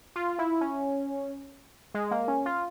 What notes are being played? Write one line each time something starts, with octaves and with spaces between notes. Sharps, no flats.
F4
E4
C#4
G#3
A#3
C#4
F4